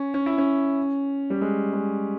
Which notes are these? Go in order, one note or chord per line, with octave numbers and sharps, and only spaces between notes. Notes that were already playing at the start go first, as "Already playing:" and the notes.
Already playing: C#4
C#4
E4
C#4
G3
G#3
G#3